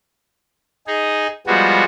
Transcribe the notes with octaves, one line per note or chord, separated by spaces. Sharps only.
D#4 G#4
F3 G3 G#3 B3 F#4